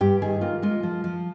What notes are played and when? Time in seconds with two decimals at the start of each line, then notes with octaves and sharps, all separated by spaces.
0.01 G2 G4
0.22 D#3 G#4
0.41 A#3 F4
0.62 G#3 F4
0.83 F3
1.04 F3